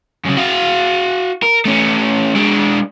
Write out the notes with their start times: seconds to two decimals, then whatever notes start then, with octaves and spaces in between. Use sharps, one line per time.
0.25 F#2 C#3
0.37 F#4 F5
1.42 A#4
1.65 A3 C#4
2.36 G#3 D4